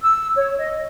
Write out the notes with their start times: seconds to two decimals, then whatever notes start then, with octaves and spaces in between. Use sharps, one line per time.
0.02 E6
0.36 C#5
0.57 D#5